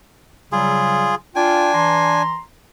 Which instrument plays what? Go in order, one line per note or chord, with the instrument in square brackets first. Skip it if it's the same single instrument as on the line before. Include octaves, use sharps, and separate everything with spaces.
[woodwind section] C#3 F#3 G3 [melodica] F4 G#4
[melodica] D4 G#5 [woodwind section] F4 G5
[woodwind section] E3 A#5 C6